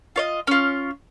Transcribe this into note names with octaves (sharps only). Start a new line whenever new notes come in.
F4 C#5 D#5
C#4 F4